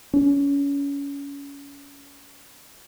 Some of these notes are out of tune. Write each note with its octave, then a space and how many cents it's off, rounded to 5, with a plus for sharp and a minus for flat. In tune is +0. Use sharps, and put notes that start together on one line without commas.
C#4 +30